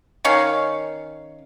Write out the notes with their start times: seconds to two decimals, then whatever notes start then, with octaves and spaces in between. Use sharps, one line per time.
0.25 D#3 C#4 C#5 F5